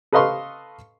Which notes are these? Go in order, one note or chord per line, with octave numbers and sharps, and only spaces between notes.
A4 B4 D#5 F5 C6 C#6